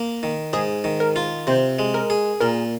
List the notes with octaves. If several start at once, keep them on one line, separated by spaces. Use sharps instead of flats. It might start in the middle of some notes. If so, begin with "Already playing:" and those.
Already playing: A#3
D#3
G#2 G#4
D#3
A#4
F4
C3 C5
G#3
A#4
G#4
A#2 A#4